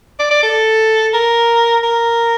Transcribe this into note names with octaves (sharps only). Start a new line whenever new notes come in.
D5
D5
A4
A#4
A#4